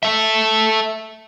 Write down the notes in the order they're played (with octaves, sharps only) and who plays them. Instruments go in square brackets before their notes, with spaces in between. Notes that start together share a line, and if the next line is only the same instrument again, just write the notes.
[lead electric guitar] A4 E5